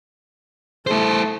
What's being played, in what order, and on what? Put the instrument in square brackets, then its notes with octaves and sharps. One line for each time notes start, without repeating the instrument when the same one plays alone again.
[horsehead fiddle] A3 [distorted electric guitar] E4 C5